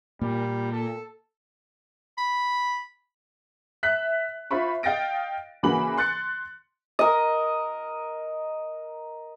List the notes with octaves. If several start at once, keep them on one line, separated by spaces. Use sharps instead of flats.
A#2 G3 A#3
A4
B5
E5 F#6 B6
E4 F4 C5 E5 B5 C#6
D#5 F5 G5 A6 A#6 D7
C#3 E3 A#3 F#4 B5 F#7
C6 F#6 A6 C#7
A#4 D#5